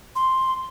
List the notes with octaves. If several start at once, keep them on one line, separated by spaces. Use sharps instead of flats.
C6